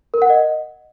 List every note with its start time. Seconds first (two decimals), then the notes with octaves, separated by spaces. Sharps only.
0.14 A#4
0.22 F#5
0.30 D#5